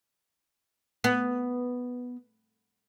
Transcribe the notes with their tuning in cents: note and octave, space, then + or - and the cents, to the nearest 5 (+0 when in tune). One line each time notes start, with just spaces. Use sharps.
B3 +0